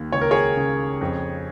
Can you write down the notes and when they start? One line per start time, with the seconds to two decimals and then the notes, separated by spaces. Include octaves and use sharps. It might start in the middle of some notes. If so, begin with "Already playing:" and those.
Already playing: D#2
0.12 C#2 C#5
0.21 A#4
0.31 G#4 C#5
0.56 C#3
1.01 F2